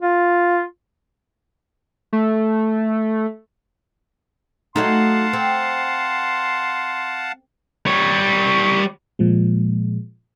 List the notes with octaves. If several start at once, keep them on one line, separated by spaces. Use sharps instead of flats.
F4
A3
F#3 A3 D#4 F5 F#5 A5 C6
C4
G3 C#5
A#2 F3 G#3